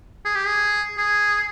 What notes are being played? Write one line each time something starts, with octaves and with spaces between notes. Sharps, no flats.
G#4
G4
G#4
G#4